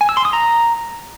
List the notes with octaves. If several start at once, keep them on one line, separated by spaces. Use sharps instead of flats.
G#5
E6
C6
D#6
A#5